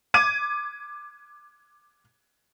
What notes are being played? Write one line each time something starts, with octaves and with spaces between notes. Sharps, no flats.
D6 G#6 D#7